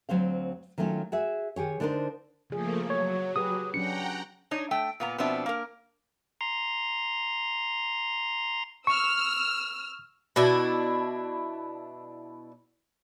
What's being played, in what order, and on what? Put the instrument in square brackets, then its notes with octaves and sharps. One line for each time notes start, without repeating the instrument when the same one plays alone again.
[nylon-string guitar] D2 F#3 C4 C5 F5
D#3 F#3 A3 C#4 F4
F#4 G#4 E5
D#3 G4 G#4 C#5
D3 D4 D#4 A#4 C5
[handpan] C#3 G#4 [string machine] F3 A3 A#3
[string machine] F#3 [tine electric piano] C#5
[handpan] G4 G#4 B4 [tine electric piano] D#6
[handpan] F#3 C#4 D4 [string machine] F#5 G5 A#5 [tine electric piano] C#7
[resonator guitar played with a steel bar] D4 D#4 C#5 D#5
A3 G5
A#2 B3 A#5
B2 F3 B3 C4 D4 E5
A#3 A#4
[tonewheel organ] A#5 C6
[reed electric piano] C#6 [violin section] E6 F6
[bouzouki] B2 D4 E4